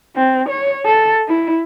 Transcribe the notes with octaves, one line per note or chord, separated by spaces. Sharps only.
C4
C#5
A4
E4